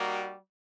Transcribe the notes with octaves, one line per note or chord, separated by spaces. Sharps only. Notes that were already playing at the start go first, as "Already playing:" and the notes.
Already playing: G3 A#3 D#4 F#4